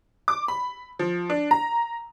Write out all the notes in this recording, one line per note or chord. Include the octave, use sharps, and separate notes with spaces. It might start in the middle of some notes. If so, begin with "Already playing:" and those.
D6
B5
F3
D4
A#5